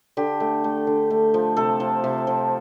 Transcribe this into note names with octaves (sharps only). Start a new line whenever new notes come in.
D3 G4
A3
A3
D3
A3
F3
C3 A4
F3
C3
F3